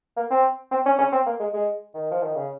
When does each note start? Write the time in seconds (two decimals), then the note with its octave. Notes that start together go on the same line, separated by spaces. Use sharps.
0.17 A#3
0.30 C4
0.71 C4
0.86 C#4
0.99 C#4
1.12 C4
1.26 A#3
1.40 G#3
1.53 G#3
1.94 D#3
2.11 F3
2.23 D#3
2.35 C#3